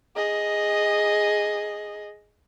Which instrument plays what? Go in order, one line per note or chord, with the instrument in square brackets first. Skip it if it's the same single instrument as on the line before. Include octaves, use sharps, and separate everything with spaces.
[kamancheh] G#4 D#5